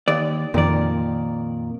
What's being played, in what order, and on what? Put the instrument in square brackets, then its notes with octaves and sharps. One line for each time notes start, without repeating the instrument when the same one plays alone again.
[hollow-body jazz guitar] D#2 D5
[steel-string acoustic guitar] F2 D#3 A#4 [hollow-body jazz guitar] A#2 D5